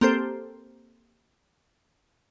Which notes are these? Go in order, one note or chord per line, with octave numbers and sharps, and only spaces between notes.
A#3 C4 G4 A4 C5